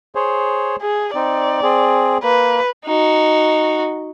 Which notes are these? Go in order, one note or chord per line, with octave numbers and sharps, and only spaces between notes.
G#4 C5 C#5
G#4
C4 D#4 D5
C4 G#4
A#3 B4
D#4 F#4